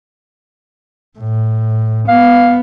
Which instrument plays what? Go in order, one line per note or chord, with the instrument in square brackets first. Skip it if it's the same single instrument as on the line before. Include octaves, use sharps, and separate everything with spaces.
[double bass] A2
[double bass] B3 [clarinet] F5